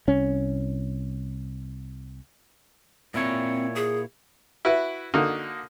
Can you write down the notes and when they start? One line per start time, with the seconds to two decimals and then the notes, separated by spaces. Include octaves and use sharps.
0.08 C2 C#4
3.14 A#2 C4 E4 C#5
3.75 G#4
4.65 E4 F#4 B4
5.14 D3 A#3 D#4 F#4